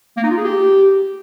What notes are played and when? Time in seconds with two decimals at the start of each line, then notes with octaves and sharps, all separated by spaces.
0.17 A#3
0.24 D#4
0.31 F4
0.37 G#4
0.44 G4